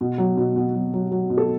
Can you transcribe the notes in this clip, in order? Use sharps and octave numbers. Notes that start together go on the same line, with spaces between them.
B2
F#3
B2
B2
F#3
F#3
F#3
B2
A4